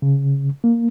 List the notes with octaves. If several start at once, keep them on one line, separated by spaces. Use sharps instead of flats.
C#3
A#3